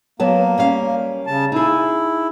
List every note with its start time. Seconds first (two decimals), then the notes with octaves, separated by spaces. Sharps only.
0.20 F#3 A#3 B3 A5
0.58 G3 C#4 F5
1.27 C#3 A5
1.52 D#4 E4 G#4